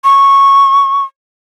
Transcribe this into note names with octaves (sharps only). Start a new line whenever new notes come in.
C#6